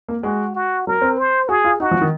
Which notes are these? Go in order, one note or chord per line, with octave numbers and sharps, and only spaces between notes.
A#3
G#3 F#4
F#4
F#3 A#4
C4
C5
F#4 G#4
F4
D#4 F#4
F3
D#3